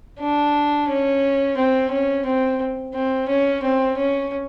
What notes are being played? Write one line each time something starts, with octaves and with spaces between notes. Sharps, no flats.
D4
C#4
C4
C#4
C4
C4
C#4
C4
C#4